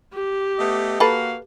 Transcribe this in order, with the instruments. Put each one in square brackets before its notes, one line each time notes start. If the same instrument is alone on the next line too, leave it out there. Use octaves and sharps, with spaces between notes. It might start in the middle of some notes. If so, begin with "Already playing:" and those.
[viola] G4
[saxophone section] A3 B3 D#5
[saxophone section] A#3 F#4 F5 [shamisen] A4 B4